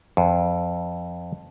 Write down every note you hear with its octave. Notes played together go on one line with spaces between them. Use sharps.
F2